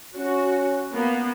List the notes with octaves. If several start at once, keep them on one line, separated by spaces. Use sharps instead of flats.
C#4 F#4
A#3 B3